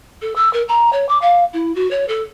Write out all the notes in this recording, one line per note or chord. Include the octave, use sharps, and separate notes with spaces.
A4
E6
A#4
A#5
C#5
D6
F5
E4
F#4
C#5
A4